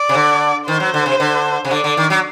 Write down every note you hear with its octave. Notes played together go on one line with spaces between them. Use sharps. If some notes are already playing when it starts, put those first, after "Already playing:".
Already playing: D5
C3
D3
D#3 C5
F#3
D3
C3
D3
C3
D3 D5
D3
D#3
F#3